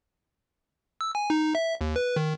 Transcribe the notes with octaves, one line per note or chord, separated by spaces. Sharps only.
E6
G#5
D#4
E5
D#2
B4
D#3